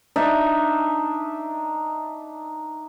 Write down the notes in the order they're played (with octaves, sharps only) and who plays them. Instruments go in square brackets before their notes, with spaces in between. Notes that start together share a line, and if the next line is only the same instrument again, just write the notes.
[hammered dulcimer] D4 D#4 E5